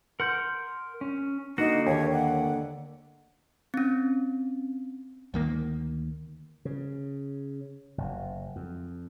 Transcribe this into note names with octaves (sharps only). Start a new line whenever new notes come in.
A#4 F#5 C6 G6
C#4
D3 A#3 D#4 F#4
D#2 C#5
F#5
C4 C#4
D2 D#3 A#3
C#3
F#1
F2